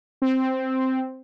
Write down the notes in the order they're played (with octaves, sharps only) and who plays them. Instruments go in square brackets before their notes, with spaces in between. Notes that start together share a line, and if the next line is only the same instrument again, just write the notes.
[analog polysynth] C4